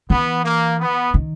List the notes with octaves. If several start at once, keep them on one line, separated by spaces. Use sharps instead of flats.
E3 B3
A#3
B3
D#3